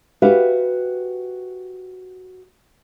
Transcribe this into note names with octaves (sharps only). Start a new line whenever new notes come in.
F#4 G4 B4 E5 F5